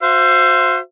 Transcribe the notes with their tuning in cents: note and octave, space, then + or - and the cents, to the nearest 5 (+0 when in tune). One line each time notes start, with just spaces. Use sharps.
F#4 -30 C5 +0 E5 +35